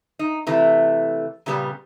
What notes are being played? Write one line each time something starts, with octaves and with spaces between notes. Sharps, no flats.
D#4
C3 E3 A3
A#2 C#3 G3 B3 G4